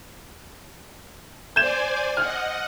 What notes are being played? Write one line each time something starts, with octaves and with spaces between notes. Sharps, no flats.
C5 D5 G#5 G6 G#6 E7
D#5 F#5 F6